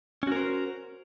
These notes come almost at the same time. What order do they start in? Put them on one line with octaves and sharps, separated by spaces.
C#4 F#4 A#4 C5